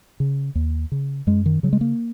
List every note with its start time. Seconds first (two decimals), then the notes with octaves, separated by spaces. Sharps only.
0.20 C#3
0.55 D#2
0.92 C#3
1.27 F#2 G#3
1.46 D#3
1.63 C#3 F#3
1.73 G#3
1.81 A#3